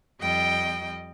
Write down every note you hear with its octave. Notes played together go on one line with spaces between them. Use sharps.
F2 G3 D#5 G5